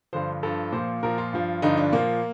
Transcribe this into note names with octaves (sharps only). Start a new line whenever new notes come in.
G2 D3 F3 C5
G2 F3 A4
A#2 F3 C5
A#2 F3 A#4
F4
G2 F3
G2 D3 F3 D#4
D4
A#2 F3 A#3